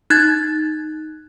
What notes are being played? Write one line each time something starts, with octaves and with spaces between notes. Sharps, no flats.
D#4 F#6 G#6 A6